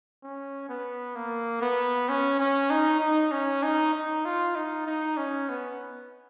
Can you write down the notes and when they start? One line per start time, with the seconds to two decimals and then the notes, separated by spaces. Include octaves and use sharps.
0.23 C#4
0.69 B3
1.16 A#3
1.61 B3
2.09 C#4
2.40 C#4
2.70 D#4
3.00 D#4
3.31 C#4
3.63 D#4
3.94 D#4
4.25 F4
4.55 D#4
4.87 D#4
5.17 C#4
5.49 B3